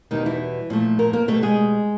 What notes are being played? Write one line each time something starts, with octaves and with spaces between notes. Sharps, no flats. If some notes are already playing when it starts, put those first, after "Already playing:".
E2 B2 D#3 G3 D#4
E3 E4
A#2 F3 A3
A#3 A#4
A#3 A#4
B2 G3 A3 A4
G#3 G#4